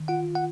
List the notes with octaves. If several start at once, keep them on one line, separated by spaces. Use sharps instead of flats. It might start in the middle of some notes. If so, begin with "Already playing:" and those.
Already playing: D#3
F4 F#5
F#5